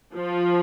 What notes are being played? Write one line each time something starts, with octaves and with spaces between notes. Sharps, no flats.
F3